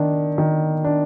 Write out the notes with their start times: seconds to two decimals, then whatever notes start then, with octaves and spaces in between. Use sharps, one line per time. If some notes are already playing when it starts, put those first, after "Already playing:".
Already playing: D#3 D4
0.38 D#3
0.84 D4